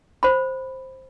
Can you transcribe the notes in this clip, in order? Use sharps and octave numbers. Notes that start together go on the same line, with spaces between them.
C5 B5